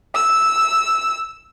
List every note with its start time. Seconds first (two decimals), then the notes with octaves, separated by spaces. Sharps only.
0.14 E6